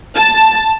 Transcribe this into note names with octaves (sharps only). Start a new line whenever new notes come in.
A5